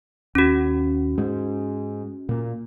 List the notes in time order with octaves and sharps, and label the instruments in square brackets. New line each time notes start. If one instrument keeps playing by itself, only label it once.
[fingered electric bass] D#2 [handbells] C#4 F#4
[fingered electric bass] G#2 G#3
A#2 A#3